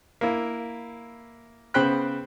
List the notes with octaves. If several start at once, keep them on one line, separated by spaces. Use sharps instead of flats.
A#3 E4
C#3 B3 C5 G5 B5 F#6